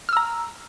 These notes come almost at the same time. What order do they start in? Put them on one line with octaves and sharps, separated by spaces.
F6 E6 A#5